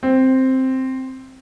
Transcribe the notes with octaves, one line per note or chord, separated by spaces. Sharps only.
C4